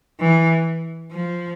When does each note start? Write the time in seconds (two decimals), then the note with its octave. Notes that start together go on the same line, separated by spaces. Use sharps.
0.20 E3
1.11 F3